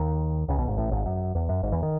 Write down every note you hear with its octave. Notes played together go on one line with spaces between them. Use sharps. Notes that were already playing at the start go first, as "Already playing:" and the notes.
Already playing: D#2 D#3
C#2 C#3
B1 B2
G#1 G#2
A1 A2
G#1 G#2
F#2
E2
F#2
G#1 G#2
E2 E3
D#3